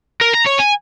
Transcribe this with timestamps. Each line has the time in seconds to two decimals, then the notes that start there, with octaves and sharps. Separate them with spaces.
0.21 A#4
0.34 A#5
0.47 C#5
0.60 G#5